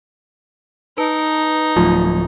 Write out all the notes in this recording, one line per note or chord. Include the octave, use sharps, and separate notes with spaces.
D#4 B4 A5
D1 F3 F#3 A3 F4